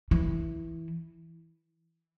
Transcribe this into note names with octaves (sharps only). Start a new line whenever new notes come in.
E3